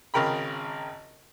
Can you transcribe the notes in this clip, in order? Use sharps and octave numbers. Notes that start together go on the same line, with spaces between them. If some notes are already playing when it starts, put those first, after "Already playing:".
G#1 C#3 A#4 G5 B5